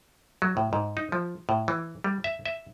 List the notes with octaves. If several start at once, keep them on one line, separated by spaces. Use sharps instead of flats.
F#3
A2
G#2
D#4
F3
A2
E3
G3
E5
E5